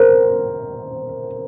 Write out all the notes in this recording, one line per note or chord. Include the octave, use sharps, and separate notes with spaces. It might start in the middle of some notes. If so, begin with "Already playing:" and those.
Already playing: A#4 C5